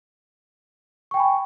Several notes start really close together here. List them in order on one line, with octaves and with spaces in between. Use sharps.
C#6 G5 G#5 B5